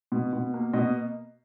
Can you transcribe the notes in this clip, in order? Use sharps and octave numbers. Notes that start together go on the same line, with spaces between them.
B2
B2
A#3
B2 D#5